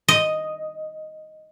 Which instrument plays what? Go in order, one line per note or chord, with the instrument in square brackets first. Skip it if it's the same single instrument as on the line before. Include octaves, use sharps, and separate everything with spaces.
[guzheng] D#5